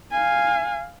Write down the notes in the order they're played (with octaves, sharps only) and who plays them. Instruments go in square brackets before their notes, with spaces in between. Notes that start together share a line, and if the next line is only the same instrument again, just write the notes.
[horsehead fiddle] F5 G#5